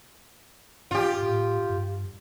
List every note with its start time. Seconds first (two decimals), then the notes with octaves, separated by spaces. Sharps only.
0.91 G#2 F4 G4
1.22 A2
1.70 G2